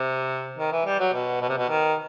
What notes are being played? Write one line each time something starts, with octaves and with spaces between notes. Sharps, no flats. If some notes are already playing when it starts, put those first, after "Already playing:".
Already playing: C3
D#3
E3
G3
F#3
B2
B2
C3
B2
D#3